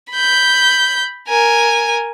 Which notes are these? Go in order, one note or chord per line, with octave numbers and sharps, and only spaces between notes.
B5 G6
A#4 G#5